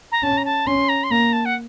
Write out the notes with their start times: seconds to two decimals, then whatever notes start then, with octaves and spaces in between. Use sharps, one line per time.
0.11 A#5
0.22 C#4 A5
0.37 A#5
0.45 A5
0.66 C#4 C6
0.88 A#5
1.03 C6
1.10 A#3 A#5
1.32 A5
1.45 F#5